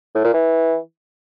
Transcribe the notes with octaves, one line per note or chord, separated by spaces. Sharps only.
A2
A#2
E3